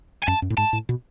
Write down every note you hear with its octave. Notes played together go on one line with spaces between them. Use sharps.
G#5
F#2 A5
F#2
A2
G#2 A5
A2
B2